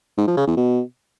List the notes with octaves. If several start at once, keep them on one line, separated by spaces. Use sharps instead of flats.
G#2
F3
C#3
E2
B2